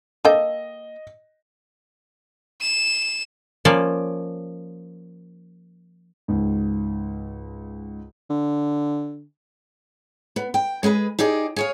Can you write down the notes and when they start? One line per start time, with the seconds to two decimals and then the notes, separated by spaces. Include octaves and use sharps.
0.25 A#3 A4 D#5 G5
2.61 E7
3.65 F3 A#3 C#4 D5
6.28 C#2 G#2
8.30 D3
10.36 B3
10.54 G5
10.83 G#3 G#4 A#4 B4
11.19 D#4 G4 G#4 D5
11.56 G#4 C#5 F5